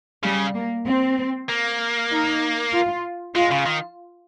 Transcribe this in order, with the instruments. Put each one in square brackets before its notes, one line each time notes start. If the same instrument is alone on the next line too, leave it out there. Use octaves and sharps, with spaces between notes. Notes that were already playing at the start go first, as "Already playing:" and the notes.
[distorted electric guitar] C#3 [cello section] G3
[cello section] A#3
C4
[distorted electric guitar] A#3
[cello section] D#4
F4
[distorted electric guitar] G#3 [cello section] F4
[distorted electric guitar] C#3
D#3